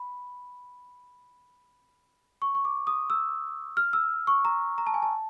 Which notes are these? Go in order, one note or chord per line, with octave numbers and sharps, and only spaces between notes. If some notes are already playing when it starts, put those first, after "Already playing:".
Already playing: B5
C#6
C#6
D6
D#6
E6
F6
E6
C#6
A#5
A#5
A5
G#5
A5